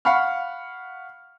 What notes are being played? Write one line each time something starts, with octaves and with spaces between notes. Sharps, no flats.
F5 F#5 B5 C#6 F6